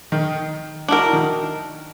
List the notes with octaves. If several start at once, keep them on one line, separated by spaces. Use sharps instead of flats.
D#3 D#4
D4 D#4 F#4 A#4
E4
D#3 D#4